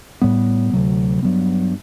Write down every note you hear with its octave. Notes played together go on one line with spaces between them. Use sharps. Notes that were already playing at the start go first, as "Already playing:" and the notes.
A2 G3 B3
D2 C3 F#3
G2 F#3 B3